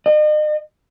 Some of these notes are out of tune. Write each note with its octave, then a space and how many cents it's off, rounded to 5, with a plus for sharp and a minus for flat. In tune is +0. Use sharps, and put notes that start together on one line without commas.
D#5 -40